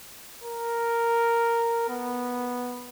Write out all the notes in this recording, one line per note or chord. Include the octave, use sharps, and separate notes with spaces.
A#4
B3